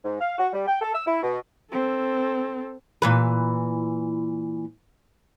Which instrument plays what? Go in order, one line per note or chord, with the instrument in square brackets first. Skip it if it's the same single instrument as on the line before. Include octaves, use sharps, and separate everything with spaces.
[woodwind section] G#2
F5
F#4
G3
G5
A4
E6
E4
B2
[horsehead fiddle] C4 A4
[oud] A#2 E3 B4